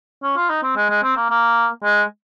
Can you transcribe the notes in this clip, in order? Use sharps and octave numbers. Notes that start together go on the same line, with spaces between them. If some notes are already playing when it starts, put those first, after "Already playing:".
C#4
F4
D#4
C4
G#3
G#3
C4
A#3
A#3
G#3